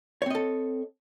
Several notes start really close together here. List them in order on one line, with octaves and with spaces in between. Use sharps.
C#5 C4 D#5 A4